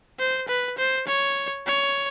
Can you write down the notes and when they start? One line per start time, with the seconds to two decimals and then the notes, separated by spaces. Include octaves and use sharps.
0.19 C5
0.48 B4
0.78 C5
1.07 C#5
1.66 C#5